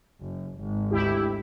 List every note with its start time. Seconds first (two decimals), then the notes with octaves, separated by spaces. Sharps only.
0.22 F#1
0.60 G#1
0.91 D2 E4 G4